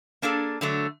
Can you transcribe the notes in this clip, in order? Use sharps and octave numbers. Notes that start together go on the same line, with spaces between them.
A#3 D4 G#4 A4
D3 F#3 A3